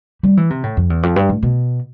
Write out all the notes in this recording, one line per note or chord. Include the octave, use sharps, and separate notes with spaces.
G3
E3
C3
A2
F2
E2
F2
G2
A2
B2